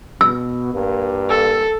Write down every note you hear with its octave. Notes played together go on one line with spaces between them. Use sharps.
B2 E6
G2 A#3
A4